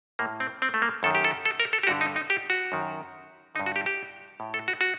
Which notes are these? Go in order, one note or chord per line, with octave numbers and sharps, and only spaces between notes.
A2 A#3
C4
C4
A3
A#3
F#2 D#3 A4
G4
A4
A4
A#4
A4
G4
G2 D3 F#4
D#4
D#4
G4
F#4
F#2 D#3
G2 D3 D#4
F#4
G4
G4
A2
A4
F#4
F#4